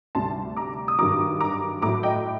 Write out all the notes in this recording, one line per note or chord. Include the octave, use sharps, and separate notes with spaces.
D2 C3 G3 A5 C6
A#5 D6
D#6
G2 D#3 F#3 A#5 D6
A#5 D6
A2 F#3 A#5 D6
D#5 G5